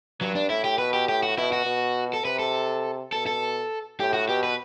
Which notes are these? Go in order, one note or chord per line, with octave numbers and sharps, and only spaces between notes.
G2 F#3
D4
A2 E4
G4
B2 B4
G4
A2 G4
F#4
B2 E4
F#4
B2
A4
C3 B4
A4
B2 A4
A4
A2 G4
F#4
B2 G4
B4